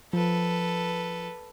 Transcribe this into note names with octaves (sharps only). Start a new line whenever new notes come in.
F3 A4 B4